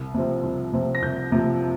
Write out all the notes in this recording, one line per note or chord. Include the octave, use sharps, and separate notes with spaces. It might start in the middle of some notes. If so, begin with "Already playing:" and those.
Already playing: C2
C3 F3 C4
C2
C3 F3 C4
A#6
C2 G6
C3 F3 C4